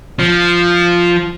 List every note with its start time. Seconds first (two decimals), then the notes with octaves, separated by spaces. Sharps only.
0.20 F3